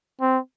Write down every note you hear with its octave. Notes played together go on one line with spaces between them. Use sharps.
C4